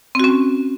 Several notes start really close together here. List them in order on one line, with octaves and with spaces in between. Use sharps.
C4 F#4 C#4